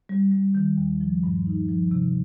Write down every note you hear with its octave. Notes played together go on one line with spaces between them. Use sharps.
G3
G3
D#3
D#2
F3
G2
D#4
F3
C3